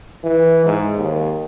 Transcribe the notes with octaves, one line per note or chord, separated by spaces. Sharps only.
E3
G#2
D#2